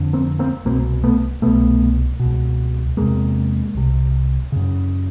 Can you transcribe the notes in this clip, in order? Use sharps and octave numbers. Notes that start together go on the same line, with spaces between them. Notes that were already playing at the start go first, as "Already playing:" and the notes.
Already playing: F2 D3
A#3 C4
A#3 C4
C2 B2 A#3 C4
A3 B3
C2 B2 A3 B3
B2
C#2
E2 C3 G#3 A#3
C2 C3
F#2 C#3